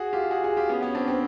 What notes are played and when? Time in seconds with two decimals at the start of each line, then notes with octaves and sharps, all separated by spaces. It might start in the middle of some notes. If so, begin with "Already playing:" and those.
Already playing: F#4 G#4
0.13 F4 G4
0.31 F#4 G#4
0.44 F#4 G#4
0.57 F4 G4
0.69 B3 C#4
0.82 B3 C#4
0.95 C4 D4
1.08 C4